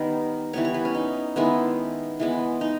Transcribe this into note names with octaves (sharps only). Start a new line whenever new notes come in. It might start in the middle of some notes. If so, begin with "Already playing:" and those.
Already playing: D#3 G3 B3 A#4
E3 G3 B3 C#5
C#5
B4
C#4
D#4
D#3 G#3 B3 E4
E3 G#3 B3
D#4